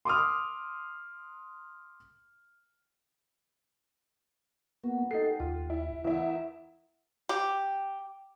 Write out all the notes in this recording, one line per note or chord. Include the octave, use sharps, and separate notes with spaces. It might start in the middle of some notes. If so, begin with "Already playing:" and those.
C6 D6 D#6 F6
A#3 B3 F#4
D#4 G4 A4 F#5 C7
D#2 F4
E4
E2 E4 A#4 E5 F#5
G4